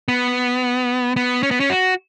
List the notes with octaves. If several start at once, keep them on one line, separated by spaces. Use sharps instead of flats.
B3
B3
C#4
B3
C#4
F#4